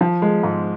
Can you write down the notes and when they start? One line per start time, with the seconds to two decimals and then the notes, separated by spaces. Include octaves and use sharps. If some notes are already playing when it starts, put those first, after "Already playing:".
0.01 F3
0.22 G#3
0.43 G#2